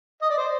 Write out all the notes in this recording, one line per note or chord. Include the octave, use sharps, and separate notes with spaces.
D#5
D5
C5